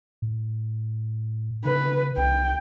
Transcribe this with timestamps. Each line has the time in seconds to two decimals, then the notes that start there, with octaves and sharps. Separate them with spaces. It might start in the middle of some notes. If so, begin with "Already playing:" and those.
0.22 A2
1.65 C#3 B4
2.17 C2 G5